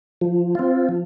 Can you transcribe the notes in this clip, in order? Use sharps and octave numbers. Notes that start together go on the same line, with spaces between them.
F3
C4 F4
F3